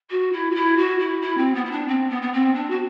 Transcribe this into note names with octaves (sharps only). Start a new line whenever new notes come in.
F#4
E4
F#4
E4
F#4
E4
E4
C4
B3
E4
D4
C4
B3
B3
C4
D4
F#4